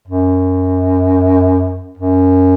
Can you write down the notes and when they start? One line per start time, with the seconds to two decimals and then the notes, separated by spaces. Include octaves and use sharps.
0.08 F#2
1.98 F#2